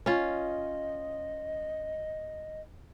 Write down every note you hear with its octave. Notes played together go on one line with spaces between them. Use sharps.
C#4 F4 D#5